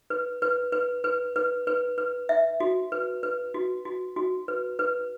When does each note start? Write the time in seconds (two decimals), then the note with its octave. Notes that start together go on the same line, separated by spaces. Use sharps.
0.10 B4
0.42 B4
0.72 B4
1.04 B4
1.36 B4
1.67 B4
1.98 B4
2.29 E5
2.60 F#4
2.92 B4
3.23 B4
3.54 F#4
3.85 F#4
4.16 F#4
4.48 B4
4.79 B4